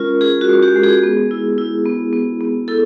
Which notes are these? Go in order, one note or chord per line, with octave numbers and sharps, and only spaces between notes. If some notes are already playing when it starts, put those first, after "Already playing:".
Already playing: G#3 C#4 F4 A#4
F4 G#4
F#4
G#3
G4
G#3
G#4
B3
E4
E4
B3
B3
B3
E4 A4